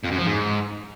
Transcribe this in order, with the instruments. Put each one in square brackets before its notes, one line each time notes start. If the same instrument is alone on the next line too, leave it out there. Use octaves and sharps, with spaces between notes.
[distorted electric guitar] F2
F#2
F3
G#2